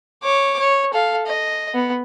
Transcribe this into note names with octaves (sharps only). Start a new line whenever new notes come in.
C#5 D6
C#5
A4 F5
D#5
B3